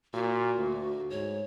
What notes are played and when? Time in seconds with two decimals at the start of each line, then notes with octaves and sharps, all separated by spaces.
0.14 A#2 F#4
0.58 D2
1.10 G#2 C#5